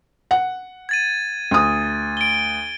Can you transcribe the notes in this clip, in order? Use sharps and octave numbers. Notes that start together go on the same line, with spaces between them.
F#5
G#6 A6 D#7
D2 D#6
D7 G7